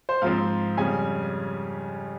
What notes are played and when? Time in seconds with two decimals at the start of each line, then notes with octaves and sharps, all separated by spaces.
0.09 C5
0.22 G#2 F3 C4 F5
0.77 F2 C#3 G3 G#5